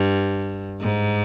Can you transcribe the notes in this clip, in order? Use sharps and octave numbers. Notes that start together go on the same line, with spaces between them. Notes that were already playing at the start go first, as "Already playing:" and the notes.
Already playing: G2
G#2